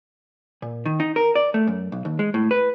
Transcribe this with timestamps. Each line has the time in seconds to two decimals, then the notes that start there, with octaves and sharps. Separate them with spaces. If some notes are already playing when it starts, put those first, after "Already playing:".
0.62 A#2
0.85 D#3
1.00 D#4
1.16 A#4
1.35 D5
1.54 A3
1.67 F#2
1.92 B1
2.05 D#2
2.19 G#3
2.34 A2
2.51 B4